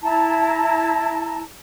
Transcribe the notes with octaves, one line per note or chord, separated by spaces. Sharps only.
E4 A5 A#5